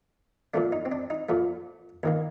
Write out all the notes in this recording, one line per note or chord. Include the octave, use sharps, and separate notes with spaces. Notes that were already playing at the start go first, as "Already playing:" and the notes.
A#2 F3 A3 D4
D#4
C4
D4
D#4
A#2 F3 A3
D#2 D#3 A#3